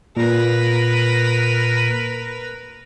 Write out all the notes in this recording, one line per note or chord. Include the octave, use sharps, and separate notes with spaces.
A#2 A#4 B4